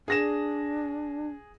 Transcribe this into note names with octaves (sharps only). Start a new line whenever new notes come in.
D4 G#4 A#6 E7